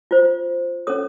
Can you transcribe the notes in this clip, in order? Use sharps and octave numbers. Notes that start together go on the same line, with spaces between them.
F4 C5
C#4 A4 C#5 D#6